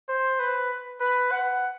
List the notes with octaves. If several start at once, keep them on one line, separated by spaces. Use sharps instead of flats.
C5
B4
B4
F#5